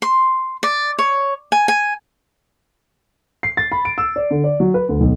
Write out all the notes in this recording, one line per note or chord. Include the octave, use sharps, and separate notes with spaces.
C6
D5
C#5
G#5
G#5
C7
A6
B5
D7
E6
D5
D3
D5
F#3
B4
D2
B1